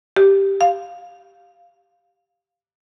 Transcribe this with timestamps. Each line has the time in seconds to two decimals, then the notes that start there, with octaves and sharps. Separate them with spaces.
0.16 G4
0.61 F5